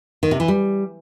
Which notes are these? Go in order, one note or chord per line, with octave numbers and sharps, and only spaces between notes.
D#3
C3
E3
G3